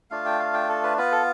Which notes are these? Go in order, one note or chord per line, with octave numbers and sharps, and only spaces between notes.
A3 D4 F4 F5
G5
F5
G5
A4
B4
B3 F4 B4
A4